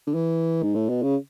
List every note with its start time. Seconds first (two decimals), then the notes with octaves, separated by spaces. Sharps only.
0.07 D3
0.14 E3
0.63 G#2
0.75 A2
0.89 B2
1.03 C#3